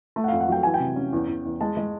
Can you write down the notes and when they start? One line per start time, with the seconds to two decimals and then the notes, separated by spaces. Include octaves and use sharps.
0.16 A3
0.24 F#5
0.28 F2 F5
0.41 F#5
0.48 F#3 G5
0.63 E3 G#5
0.74 G5
0.80 C3
0.96 C#4
1.13 E2
1.28 E2
1.45 E2
1.61 G#3 A5
1.77 G#3